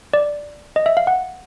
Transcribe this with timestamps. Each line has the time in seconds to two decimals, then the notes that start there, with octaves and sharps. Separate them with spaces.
0.13 D5
0.76 D#5
0.86 E5
0.97 F5
1.07 F#5